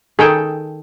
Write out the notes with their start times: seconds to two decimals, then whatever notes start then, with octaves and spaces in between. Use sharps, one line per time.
0.19 D#3 G#4 A4 G5